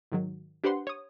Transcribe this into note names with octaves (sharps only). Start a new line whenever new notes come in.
G#2 D#3 F#3
D4 G4 B4 C5 F#5 C6
C#5 D#6